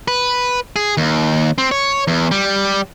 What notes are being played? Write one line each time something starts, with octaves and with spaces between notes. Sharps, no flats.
B4
G#4
D#2
C4
C#5
E2
G3